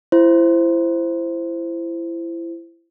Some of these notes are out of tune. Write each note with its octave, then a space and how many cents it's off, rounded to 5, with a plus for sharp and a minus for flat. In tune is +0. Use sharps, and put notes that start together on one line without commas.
E4 +25 C5 +0